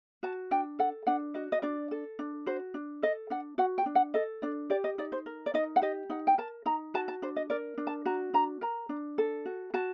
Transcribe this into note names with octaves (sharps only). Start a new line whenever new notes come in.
F#4 A5
D4 G5
A4 F#5
D4 F#5
F#4 D#5
D#5
D4 D5
A4
D4
F#4 C5
D4
A4 D#5
D4 F#5
F#4 F#5
G5
D4
F#5
A4 D#5
D4 D5
G4 D5
D#5
D#4 D5
C5
A#4
D5
D#4 D#5
F#5
G4 D#5
D#4 F#5
G5
A#4 A5
D#4 A#5
F#4 A5
A5
D4 C5
D#5
A#4 D5
D4
A5
F#4 A#5
D4 A#5
A#4 A#5
D4
A4
F#4
F#4 A5